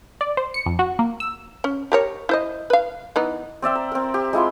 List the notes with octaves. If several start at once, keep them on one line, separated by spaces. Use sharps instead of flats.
D5
C5
C#7
F2
F#4
A#3
E6
C#4
G4 A#4 C#5
E4 C5 D#5
B4 F5
E3 B3 D#4
C4 D5 E5 G5
A#5
C4 A#4
G4
G#3 E4 F4 C6